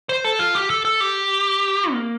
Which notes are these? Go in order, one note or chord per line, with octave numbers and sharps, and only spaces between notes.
C5
A4
F4
G4
A4
A4
G4
A#3